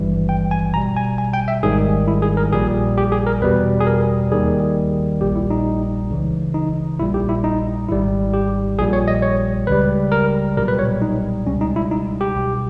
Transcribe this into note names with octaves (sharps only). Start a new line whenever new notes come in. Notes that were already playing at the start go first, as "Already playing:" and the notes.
Already playing: G#1 G2 E3 G3
G5
G#5
B1 B2 G3 A#5
G#5
G#5
G5
E5
G#1 G#2 D#3 G3 G#4
E4
G#4
A#4
A#1 A#2 G3 G#4
G4
G#4
A#4
E2 B2 G3 B4
G#4
A#4
D#2 D#3 G3 G#4
A#1 A#2 G3 G4
E4
D#4
C#2 C#3 E3
D#4
A#1 A#2 G3 E4
G4
E4
D#4
G#1 G#2 G3 E4
G4
A#1 A#2 G3 G#4
C#5
D#5
C#5
C#2 C#3 G3 B4
A#4
B1 A#2 G3 A#4
B4
C#5
D#4
C#2 B2 G3 C#4
D#4
E4
D#4
G4
B1 B2 G3